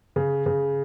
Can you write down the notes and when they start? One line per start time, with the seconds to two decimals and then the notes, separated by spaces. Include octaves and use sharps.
0.16 C#3
0.46 C#3